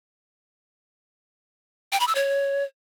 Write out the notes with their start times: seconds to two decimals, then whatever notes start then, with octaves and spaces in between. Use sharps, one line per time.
1.93 G5
2.00 B5
2.08 E6
2.15 C#5